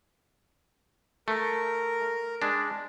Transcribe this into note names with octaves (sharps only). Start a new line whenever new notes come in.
A3 A#4
G#3 D4